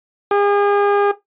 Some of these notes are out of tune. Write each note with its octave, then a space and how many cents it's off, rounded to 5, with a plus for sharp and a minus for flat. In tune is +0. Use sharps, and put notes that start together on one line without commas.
G#4 -40